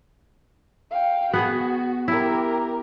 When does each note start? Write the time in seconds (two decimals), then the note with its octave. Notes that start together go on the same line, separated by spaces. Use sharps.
0.91 F5 G5
1.33 B3 F#4 G#4
2.08 E4 G4 A#4